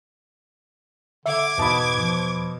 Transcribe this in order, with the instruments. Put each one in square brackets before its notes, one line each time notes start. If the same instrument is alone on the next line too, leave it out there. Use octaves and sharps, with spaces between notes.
[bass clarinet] D3 [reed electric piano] E5 [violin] D6 G#6
[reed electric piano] E2 B5 [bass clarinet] G#2 [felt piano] B2 A5 D#6
[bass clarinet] F3